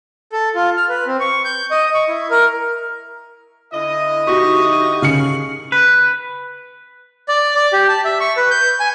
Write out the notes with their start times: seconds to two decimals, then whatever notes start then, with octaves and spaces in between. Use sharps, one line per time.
0.32 A4
0.55 F4
0.77 F6
0.89 B4
1.06 C4
1.20 C#6
1.45 G6
1.71 D#5
1.95 C#6
2.08 E4
2.30 A#4
3.74 D3 E4 D#5
4.27 D#4 F#4 G4 C#6
5.02 C#3 F6 C7 C#7 F#7
5.72 B4
7.28 D5
7.56 D5
7.73 G4
7.88 A5
8.05 E5
8.20 C#6
8.37 B4
8.51 G6
8.80 G#5